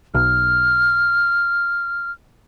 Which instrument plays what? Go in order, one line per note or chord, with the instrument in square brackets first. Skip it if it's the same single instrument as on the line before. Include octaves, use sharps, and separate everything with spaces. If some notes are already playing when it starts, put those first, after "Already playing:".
[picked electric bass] B1 [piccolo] F6